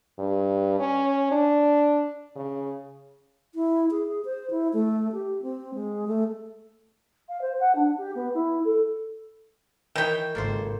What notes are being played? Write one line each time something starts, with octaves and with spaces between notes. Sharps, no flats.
G2
C#4
D4
C#3
E4
G#4
C5
E4
A3
G4
C4
G#3
A3
F5
C5
F#5
D4
G4
B3
E4
A4
D#3 E3 A#4 C#5 E5 G5
G#1 C#2 A#3 A4 C5